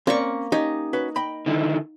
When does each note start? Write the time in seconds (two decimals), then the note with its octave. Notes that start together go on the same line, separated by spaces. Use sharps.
0.07 A#3 C4 C#4 D5 C#6
0.52 C#4 D#4 G4
0.93 C#4 F#4 B4
1.16 D#5 G5 B5
1.46 D3 D#3 E4